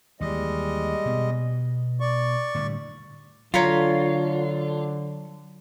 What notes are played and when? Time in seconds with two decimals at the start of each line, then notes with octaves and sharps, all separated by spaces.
0.21 D#2 E3 G3 G#3 D#5
1.06 B2 B3
2.00 D5 C#6
2.55 A2 D3 G3
3.54 D3 F#3 F4 C#5 A#5 B5